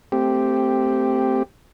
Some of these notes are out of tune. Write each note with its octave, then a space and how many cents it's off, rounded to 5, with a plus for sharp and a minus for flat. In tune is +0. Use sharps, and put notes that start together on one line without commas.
A3 +20 C4 -5 G4 +0